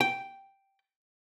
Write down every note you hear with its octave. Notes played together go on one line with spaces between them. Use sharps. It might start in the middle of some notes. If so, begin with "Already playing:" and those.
G5